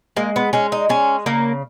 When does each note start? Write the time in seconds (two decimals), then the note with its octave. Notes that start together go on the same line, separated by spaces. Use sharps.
0.17 G#3 A#3
0.36 B3
0.53 G#3 C#4
0.72 D#4
0.89 G#3 C#4
1.26 C#3 A#3